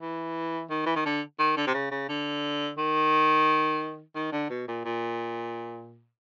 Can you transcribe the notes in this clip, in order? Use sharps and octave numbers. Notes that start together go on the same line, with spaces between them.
E3
D#3
E3
D#3
D3
D#3
D3
C3
C#3
C#3
D3
D#3
D#3
D3
B2
A#2
A#2